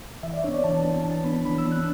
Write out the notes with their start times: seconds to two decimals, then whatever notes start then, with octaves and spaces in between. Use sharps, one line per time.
0.23 E3 E5
0.33 D5
0.44 B3 D4 C#5
0.55 D5
0.64 E3 A5
0.84 B3 D4 A5
1.04 E3 A5
1.24 B3 D4 B5
1.45 E3 B5
1.58 E6
1.65 B3 D4
1.72 F#6